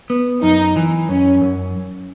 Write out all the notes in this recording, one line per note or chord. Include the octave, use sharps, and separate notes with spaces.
B3
F#2 D#4
E3
F#2 C#4
F#2